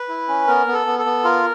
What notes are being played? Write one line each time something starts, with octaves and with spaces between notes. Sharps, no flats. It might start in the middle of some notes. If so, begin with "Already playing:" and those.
Already playing: B4
E4
C#4
B3 A#4
B3
A4
B3
A4
B3
F4 A#4